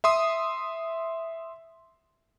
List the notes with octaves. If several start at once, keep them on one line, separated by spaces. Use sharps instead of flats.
E5 C6 D#6